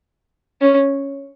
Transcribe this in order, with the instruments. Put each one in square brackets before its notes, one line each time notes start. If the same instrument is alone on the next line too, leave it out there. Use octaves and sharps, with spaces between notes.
[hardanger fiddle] C#4